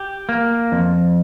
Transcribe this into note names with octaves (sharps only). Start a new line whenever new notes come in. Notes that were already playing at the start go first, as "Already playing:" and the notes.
Already playing: G4
A#3
F2